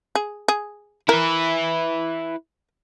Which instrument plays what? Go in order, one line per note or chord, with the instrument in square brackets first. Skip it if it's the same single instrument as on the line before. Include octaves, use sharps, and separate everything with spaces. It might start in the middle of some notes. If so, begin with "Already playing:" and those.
[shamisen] G#4
G#4
[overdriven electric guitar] E4 B4 [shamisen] A#4